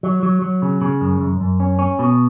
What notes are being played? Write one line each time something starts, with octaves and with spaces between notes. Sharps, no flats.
F#3
F#3
F#3
C#3
C#3
F#2
F#2
F#2
C#4
C#4
B2